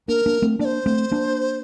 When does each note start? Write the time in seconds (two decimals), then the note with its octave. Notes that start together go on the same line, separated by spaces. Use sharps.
0.08 A#3 D4 A#4
0.26 A#3 D4
0.42 A3 C4
0.59 A#3 D4 D5
0.65 C5
0.86 A3 C4
1.11 A#3 D4